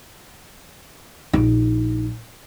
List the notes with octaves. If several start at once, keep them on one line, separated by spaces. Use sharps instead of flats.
A#1 D#4